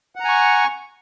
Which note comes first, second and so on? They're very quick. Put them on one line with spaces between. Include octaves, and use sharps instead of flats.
F#5 A#5 G#5 C#6